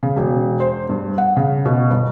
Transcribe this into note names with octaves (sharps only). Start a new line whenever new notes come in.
C#3
E1
C5
G2
F#5
C#3
B2
G1